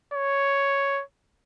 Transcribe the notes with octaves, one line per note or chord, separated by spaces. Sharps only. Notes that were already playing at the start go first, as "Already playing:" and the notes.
C#5